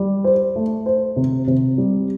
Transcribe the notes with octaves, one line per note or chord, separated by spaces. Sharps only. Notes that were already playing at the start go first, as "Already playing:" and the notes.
Already playing: G3
C5
A3
C5
C3
C3
G3